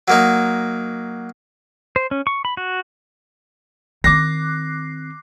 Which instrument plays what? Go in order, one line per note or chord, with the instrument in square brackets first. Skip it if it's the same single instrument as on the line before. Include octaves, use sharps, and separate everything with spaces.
[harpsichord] F#3 A#3 D#4
[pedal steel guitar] C5
C#4
C#6
B5
F#4
[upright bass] D#3 C4 [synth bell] D6 F#6 C7 [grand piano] A#6